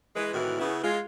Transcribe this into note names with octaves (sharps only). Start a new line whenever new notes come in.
E3 G#3 B4
A2 C3 D#3 E3 F#4 A#4
C#3 B3 E4
G#3 F4